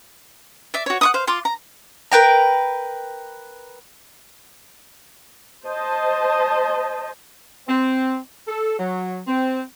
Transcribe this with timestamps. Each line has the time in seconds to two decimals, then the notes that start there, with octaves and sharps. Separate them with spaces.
0.74 D5 E5
0.86 F#4 C#5
1.01 F#5 C#6 D#6
1.14 C5 F5
1.27 F4 F5 C6 D6
1.45 A#5
2.12 A#4 B4 G5 A#5
5.65 C5 D#5 A5
7.68 C4
8.48 A4
8.79 F#3
9.28 C4